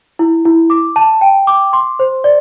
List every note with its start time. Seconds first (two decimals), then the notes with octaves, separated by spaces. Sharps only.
0.19 E4
0.45 E4
0.70 D6
0.96 A5
1.21 G5
1.47 D6
1.73 C6
1.99 C5
2.24 D5